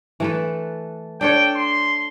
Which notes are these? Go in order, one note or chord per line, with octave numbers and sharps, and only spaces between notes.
E3 A3 B4
D4 A4 C#5 G5
C6